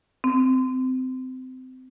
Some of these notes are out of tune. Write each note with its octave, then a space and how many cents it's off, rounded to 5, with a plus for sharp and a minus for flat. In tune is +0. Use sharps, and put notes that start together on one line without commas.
C4 -25